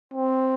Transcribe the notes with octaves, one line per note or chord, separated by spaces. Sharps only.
C4